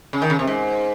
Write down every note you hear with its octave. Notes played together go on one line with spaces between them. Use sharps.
C#3
D#3
C#3
C3
G#2